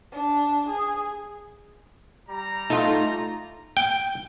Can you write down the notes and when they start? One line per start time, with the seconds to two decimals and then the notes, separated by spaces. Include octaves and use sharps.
0.12 D4
0.69 G#4
2.29 G3 A#5
2.70 A3 D#4 F4
3.77 G5